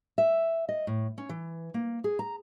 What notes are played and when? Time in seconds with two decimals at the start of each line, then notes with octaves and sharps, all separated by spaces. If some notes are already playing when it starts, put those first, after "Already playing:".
0.18 E5
0.69 D#5
0.87 A2
1.18 C#4
1.29 E3
1.74 A#3
2.04 G#4
2.19 A#5